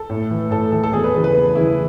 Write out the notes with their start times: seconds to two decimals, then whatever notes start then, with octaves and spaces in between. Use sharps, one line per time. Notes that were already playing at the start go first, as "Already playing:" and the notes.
Already playing: A4
0.10 A2
0.31 E3
0.51 A2 A4
0.72 E3 A4
0.84 A4
0.93 E2 G#4
1.04 B4
1.14 C#3 B4
1.17 E3
1.24 B4
1.34 E2
1.55 C#3 E3 E4